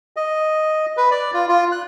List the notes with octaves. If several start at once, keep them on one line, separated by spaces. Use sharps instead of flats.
D#5
B4
D5
F4
F4
F#6